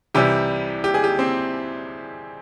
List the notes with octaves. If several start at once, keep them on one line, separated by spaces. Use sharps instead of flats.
C2 C3 E3 G3 G4
G4
G#4
G4
C4